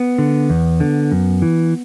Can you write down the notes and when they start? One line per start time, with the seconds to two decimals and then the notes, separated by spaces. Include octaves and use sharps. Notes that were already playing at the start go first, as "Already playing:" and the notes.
Already playing: B3
0.18 D3
0.50 E2
0.80 D3
1.12 F#2
1.42 E3